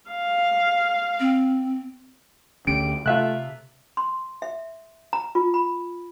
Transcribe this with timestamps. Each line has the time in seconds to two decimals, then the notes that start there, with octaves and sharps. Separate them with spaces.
0.11 F5
1.19 C4
2.67 D2 D3 C#4 G4 D7
3.06 C3 A3 F4 E5 F#6
3.97 C6
4.42 E5
5.13 A#5
5.35 F4
5.54 B5